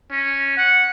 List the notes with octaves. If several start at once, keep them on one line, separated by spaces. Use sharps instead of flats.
C#4
F#5